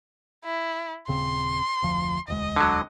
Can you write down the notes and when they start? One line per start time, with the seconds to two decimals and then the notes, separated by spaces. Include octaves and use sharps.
0.45 E4
1.08 D#1 C#3 C4 C6
1.82 F1 D2 F3
2.28 E1 D2 G#3 D#5
2.56 D3 F#3